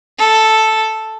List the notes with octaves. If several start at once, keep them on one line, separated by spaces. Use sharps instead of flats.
A4